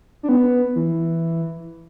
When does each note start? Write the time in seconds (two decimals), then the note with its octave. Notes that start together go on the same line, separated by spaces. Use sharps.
0.23 D4
0.29 B3
0.76 E3